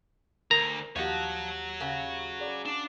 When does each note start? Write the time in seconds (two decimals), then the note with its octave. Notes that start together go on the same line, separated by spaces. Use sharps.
0.51 D2 A#4 A#5
0.96 D#2 F3 F#4 G4 C#5 D#5 F#5
1.80 C#3 F#4
2.40 G#4 D5 D6
2.66 D4